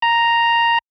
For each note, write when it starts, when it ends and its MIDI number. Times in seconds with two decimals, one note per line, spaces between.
0.02 0.78 82